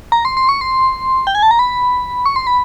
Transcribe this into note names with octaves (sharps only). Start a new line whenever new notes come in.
A#5
C6
C6
C#6
C6
G5
G#5
A5
A#5
B5
C#6
C6
B5